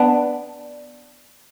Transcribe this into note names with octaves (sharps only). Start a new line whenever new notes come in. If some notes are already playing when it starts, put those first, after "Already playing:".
Already playing: B3 D4